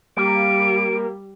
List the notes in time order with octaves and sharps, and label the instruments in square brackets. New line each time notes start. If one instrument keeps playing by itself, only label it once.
[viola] G3 [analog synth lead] A#3 [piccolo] D7